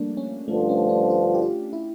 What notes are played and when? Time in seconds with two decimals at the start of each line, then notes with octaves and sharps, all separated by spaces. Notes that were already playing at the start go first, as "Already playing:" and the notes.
Already playing: F3 G3 A3 A#3 D4
0.17 C#4
0.47 G2 D3 F3 A3
0.69 C#4
0.89 D4
1.10 F4
1.34 G4
1.42 F4
1.73 E4